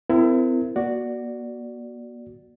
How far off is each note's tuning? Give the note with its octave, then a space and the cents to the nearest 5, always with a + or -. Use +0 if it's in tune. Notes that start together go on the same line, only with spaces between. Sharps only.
C4 -30 E4 +25 A#4 -35
A#3 +40 F#4 +0 D5 +0